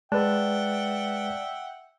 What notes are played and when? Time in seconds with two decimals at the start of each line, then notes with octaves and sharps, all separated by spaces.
0.12 G#3 B4 D5 E5 F#5 G5 A5 F#6